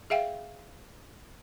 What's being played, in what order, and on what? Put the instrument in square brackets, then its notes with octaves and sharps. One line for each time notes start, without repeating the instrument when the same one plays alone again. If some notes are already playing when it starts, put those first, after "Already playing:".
[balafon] G#4 E5 F5 G5